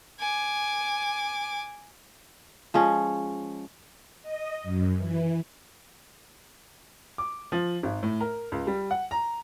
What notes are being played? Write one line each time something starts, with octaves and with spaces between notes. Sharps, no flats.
G#5 D6
F3 G#3 C#4
D#5
F#2
E3
D6
F3
G#1
A2
A#4
C#2
G3
F#5
A#5